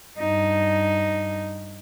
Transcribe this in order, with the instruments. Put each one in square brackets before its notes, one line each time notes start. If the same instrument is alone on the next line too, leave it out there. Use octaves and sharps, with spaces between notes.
[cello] G2 D#4